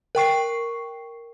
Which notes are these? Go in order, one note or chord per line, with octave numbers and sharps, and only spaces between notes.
A#4 G5 C#6 C7